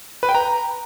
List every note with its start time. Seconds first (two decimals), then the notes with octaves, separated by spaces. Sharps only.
0.23 B4
0.29 G5
0.35 A#5